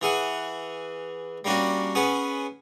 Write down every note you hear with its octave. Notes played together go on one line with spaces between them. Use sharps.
E3 G#4 F#5
G3 A#3 C#4 D4 F#4
B3 C#4 G#4 B4